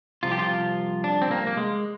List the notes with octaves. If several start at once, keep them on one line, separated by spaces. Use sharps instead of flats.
C2 C3 F3 F4
G4
F4
D4
C4
A#3
A#3
G#3